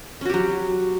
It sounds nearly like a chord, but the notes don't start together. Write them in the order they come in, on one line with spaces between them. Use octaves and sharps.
C#4 F#4 G4 F#3